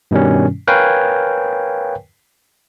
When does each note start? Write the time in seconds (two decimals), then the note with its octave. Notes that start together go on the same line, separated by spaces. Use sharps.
0.11 G2 B2 D#3 G3 C#4
0.67 A#4 B4 C#5 F5 G5 G#5